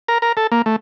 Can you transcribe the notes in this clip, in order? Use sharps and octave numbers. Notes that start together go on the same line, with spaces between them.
A#4
A#4
A4
A#3
A3